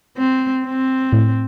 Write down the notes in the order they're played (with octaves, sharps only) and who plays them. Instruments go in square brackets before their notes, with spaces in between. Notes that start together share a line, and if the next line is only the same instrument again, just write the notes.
[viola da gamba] C4
C4
[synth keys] A2